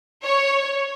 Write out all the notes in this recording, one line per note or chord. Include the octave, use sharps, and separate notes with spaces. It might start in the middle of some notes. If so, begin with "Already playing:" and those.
C#5